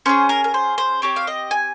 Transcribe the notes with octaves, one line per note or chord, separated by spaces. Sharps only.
C#4 G#4 C5
A#4
A#4
C5
C5
C4 G4 C#5
F5
D#5
G#5